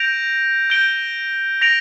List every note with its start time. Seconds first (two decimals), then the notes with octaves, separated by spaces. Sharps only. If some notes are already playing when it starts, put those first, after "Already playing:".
Already playing: G6 A#6 D7 F7
0.70 G6 D7 G7
1.61 A#6 D7 F7